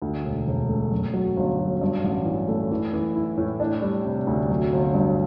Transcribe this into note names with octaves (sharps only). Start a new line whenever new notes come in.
D2
E1
E1
A3
F#2
F#3
G1
F#3
G2
A1
E3
A3
E3
E3
E4
A2
D4
G3
C3
D2
F#3
G1
G2